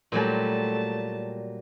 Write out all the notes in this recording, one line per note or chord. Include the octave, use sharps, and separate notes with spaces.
A#2 F#3 G3 A3 A5